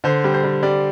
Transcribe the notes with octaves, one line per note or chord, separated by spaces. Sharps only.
D3 C5
G3
C5
G3
G3 D5